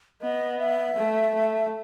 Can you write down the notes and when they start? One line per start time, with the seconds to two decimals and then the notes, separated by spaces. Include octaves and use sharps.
0.21 B3 D#5
0.59 E5
0.96 A3
1.34 A3